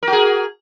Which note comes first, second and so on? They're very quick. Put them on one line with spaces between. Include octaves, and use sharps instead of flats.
A#4 F#4 G#4